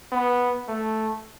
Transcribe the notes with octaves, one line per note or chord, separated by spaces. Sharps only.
B3
A3